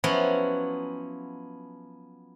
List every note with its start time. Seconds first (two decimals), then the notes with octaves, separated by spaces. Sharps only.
0.04 F3 F#3 B3 C#4 E4 F#4